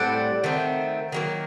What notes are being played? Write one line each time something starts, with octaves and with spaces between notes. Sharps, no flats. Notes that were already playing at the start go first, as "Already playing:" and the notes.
Already playing: A2 G3 C4 D5 F#5
D#3 A3 C4
D#3 F#3 A#3